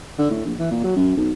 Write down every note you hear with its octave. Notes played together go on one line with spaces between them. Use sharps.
D3
A2
A#1
E3
A#2
F#3
F#2
B1